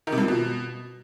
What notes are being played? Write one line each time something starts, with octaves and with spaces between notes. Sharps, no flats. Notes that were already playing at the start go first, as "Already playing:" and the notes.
D#3
C3
G2
F3
B2